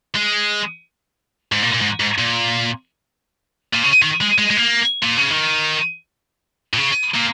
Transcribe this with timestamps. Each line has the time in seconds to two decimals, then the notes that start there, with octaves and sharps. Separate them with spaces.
0.16 G#3
1.52 G#2
1.63 A#2
1.74 A#2
1.82 G#2
2.00 G#2
2.19 A#2
3.73 A#2
3.83 C#3
4.02 D#3
4.21 G#3
4.38 G#3
4.50 G#3
4.57 A#3
5.03 A#2
5.18 C#3
5.31 D#3
6.74 A#2
6.78 C#3
7.15 A#2